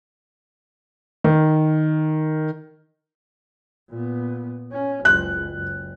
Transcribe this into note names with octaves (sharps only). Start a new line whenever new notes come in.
D#3
A#2 B3
C#4
F#1 C#2 F#6
F#1